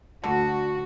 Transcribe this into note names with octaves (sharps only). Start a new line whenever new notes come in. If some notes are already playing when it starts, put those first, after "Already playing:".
D2 D3 F#4